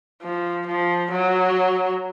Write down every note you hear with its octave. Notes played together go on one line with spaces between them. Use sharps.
F3
F3
F#3